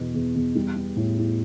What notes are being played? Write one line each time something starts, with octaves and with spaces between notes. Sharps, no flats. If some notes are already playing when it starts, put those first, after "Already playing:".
Already playing: E2 B2
E2
E2
G3
B3
A2
E4